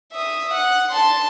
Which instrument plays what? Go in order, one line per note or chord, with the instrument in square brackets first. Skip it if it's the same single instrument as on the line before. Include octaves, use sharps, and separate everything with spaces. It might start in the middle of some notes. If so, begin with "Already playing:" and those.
[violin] E5 D#6
F#5
A5 C6